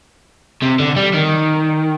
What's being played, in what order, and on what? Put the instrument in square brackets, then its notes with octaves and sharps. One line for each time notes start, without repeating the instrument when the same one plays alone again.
[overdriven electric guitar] C3
D3
G3
D#3